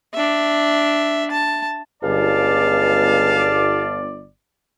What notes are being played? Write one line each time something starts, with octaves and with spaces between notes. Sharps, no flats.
D4 E5
A5
G1 C#2 D5 F5 A5